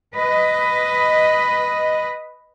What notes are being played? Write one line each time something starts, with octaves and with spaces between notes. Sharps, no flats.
B4 D#5